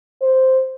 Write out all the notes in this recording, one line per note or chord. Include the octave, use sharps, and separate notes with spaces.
C5